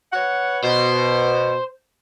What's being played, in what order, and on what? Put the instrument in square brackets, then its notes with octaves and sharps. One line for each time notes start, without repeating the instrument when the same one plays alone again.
[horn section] B4 C#5 F#5
[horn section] B2 [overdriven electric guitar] C5